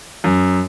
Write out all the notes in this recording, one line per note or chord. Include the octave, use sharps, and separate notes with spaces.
F#2